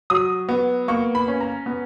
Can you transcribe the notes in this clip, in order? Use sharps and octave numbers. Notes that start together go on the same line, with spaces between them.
F#3 D#6
B3
A#3 C#6
B5
C#4
A#5
B3